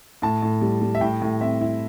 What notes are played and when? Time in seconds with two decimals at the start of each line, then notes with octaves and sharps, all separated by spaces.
0.22 A2 A5
0.42 A2
0.61 G3
0.82 G3
0.95 E5
1.01 A2 G5
1.22 A2
1.40 C4 E5
1.61 E4